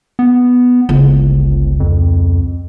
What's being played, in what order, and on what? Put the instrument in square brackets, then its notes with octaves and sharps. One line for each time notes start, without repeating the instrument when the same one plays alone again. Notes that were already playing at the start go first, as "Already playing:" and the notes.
[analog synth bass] B3
[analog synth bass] G1 [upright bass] C#2
[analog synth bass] F2